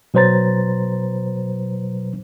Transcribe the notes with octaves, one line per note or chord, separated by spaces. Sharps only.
B2 F#3 B4 C5 A#5 A6